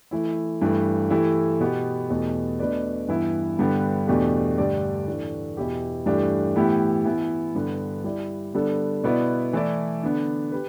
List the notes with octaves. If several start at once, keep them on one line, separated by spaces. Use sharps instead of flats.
E3 A3 E4
G2 E3 A3
E3 A3 E4 G4
B2 B3 G4
E2 B2 A3 G4
B2 A3 D4 B4 D5
G2 E3 B3 E4
G2 D3 B3 G4
E2 B2 A3 D4 G4
G2 D3 A3 G4 D5
A2 E3 A3 D4
E2 B2 B3 E4 G4
G2 E3 A3 D4 G4
A2 E3 B3 E4 G4
E3 B3 E4
G2 D3 B3
G3 E4 G4 D5
D3 G3 B3 D4 A4
B2 B3 E4 B4 D5
E3 A3 E4 A4 D5
D3 B3 D4
G4 B4